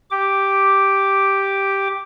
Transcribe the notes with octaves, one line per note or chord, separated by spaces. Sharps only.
G4 D6